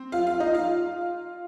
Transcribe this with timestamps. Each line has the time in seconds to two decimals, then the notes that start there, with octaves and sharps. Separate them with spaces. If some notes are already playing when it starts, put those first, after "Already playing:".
Already playing: C4
0.12 F4 F5
0.26 F4 F5
0.40 D#4 D#5
0.54 F4 F5